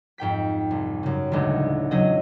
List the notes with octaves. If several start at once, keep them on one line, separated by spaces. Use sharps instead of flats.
F2 G#2 G5 B6
C2
F#2 C#3
D#1 A1 D2 G#3
E2 C#3 F#3 C#4 D#5